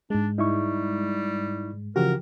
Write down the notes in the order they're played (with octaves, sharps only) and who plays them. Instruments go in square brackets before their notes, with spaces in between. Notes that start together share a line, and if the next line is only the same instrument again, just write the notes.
[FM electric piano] G#2 G#3 [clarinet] D4
[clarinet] G3 [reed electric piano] D#4 E4 C#6
[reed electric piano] C#3 E3 F#4 [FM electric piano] F3 G4 [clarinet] A#4